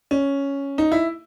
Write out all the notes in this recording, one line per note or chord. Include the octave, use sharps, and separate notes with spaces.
C#4
D#4
E4